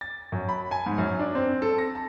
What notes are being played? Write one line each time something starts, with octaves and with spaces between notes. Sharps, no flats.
A6
F#2
B5
G#5
G#2
F#2
D4
C4
A4
A#6
A5